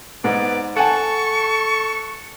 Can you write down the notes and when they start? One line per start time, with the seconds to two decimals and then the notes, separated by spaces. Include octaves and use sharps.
0.24 G#2 B3 D5
0.77 A4 F#5 G#5 A5 C#6